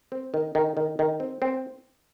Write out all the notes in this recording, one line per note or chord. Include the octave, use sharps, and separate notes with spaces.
C4
D#3
D#3
D#3
D#3
C4
C4